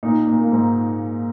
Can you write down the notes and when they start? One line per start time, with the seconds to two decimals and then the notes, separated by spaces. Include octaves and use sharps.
0.03 A#2 D#4
0.27 A#2
0.39 A#3
0.52 G#2